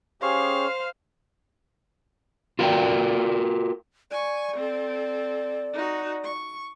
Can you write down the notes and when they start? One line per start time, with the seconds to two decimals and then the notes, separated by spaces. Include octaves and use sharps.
0.22 C#4 G4 G#4 C5 C#5 F5
2.59 F4 F#4 A#4 C5 D5 G5
4.11 D5 G#5 C#6
4.56 C4 A4
5.74 D#4 F#4
6.24 C#6